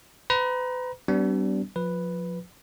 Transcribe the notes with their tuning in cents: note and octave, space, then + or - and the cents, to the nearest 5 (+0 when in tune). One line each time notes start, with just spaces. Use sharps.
B4 +40 A#5 +35
G3 -30 B3 +25 D4 -20
F3 +30 B4 +0